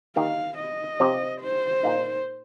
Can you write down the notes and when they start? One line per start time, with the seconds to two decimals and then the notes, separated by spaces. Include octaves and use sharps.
0.16 D#3 A#3 D#4 G4 F5
0.59 D#5
1.00 C3 F3 C4 G4
1.42 C5
1.83 A#2 A#3 D#4